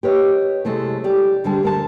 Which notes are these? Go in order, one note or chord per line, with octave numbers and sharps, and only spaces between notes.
G4 B4 C#5 D#5
C3 G#3 A3 E4
G4 D5
D2 D3 G3 G#3 A5
D2 A#4 A5